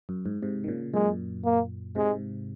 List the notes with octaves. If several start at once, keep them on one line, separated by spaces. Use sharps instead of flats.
F#2
G#2
G#2 C3
D#3
A#2 C#3
F#2 A#2 G#3
A#3
G#2 C3 G#3